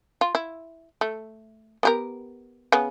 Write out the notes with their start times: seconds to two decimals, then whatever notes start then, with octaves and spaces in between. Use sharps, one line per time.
0.21 F4
0.35 E4
1.01 A3
1.83 B3 G4 A#4
2.72 C#3 B3